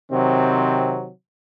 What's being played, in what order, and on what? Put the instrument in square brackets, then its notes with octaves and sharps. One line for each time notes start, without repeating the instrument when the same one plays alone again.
[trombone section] C3 D#3 F#3 C4